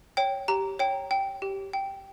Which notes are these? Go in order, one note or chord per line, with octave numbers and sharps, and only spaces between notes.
C#5 G5
G4 A#5
C#5 G5
G5
G4
G5